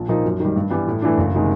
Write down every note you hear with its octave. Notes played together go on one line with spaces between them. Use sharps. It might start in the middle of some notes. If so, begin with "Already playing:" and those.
Already playing: A#1
A#2 F3 A#3 D#4
F#2
D#3 G3
G2
E3 G3 B3
A2
E3 A3 D4
F#1
C3 D#3 G#3